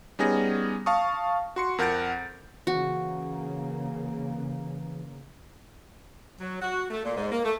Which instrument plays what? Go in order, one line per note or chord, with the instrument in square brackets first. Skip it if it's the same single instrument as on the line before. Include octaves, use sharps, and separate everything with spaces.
[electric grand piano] G3 B3 C#4 D#4 G#4 A#6
F5 A5 C#6 D#6
F#4 C6 C#7
F2 A#4 F#5 G6 A6 D7
[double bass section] C#3 A#3 [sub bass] E3 [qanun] F#4
[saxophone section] F#3
F#4
A3
A#2
G#2
A#3
A3